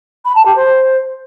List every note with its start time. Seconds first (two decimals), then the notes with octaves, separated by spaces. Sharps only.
0.25 B5
0.35 A5
0.45 G4
0.55 C5